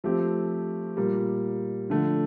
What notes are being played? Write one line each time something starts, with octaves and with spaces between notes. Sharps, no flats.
F3 A3 C4 G4
A#2 G3 A#3
D3 F3 A3 D4